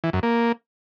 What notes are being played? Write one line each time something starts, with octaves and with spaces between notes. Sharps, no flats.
E3
F#2
A#3